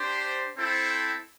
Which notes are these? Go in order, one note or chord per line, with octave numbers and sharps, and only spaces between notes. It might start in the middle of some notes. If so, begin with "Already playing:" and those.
Already playing: D4 G4 C5
C4 E4 A4 C5 G5